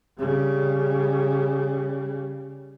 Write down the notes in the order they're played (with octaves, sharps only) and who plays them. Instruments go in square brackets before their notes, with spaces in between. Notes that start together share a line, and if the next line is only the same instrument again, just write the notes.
[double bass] C#3 G3